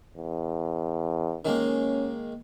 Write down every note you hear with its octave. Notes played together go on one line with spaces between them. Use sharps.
E2
D#3 G#3 A#3 C#4